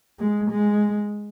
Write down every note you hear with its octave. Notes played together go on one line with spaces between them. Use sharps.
G#3
G#3